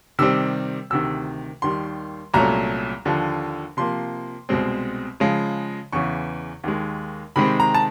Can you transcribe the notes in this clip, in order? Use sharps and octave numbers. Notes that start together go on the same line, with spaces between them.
C3 D#3 G3 C4 E6
D2 C3 D#3 E6
D#2 D#3 G3 C6
C2 A#2 F#3 A3 C#4 A#5
D#2 D3 F3
C3 F3 A#3 C6
C2 B2 G#3 C4
C#3 F3 G#3
E2 C#3 E3 C#6
D#2 D#3 G#3
C3 D#3 G#3 C4 B5
A#5
A5